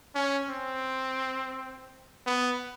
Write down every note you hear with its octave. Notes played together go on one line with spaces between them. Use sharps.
C#4
C4
B3